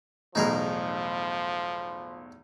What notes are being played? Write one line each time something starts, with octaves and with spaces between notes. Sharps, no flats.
B1 E2 A2 F3 D#4 G#4 A#4